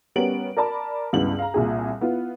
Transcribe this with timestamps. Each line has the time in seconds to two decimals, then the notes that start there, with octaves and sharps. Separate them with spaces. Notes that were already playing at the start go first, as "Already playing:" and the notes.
0.16 G3 B3 C#4 A#4 D7 F#7
0.57 A#4 D5 A5 B5
1.13 C#2 G2 B3 E4 F#7
1.39 F5 A#5
1.54 C2 A#2 G#4
2.01 B3 E4 F4